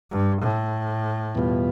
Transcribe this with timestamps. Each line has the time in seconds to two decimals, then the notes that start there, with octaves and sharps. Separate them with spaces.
0.11 G2
0.41 A2
1.35 E2 B2 G3 B3 F4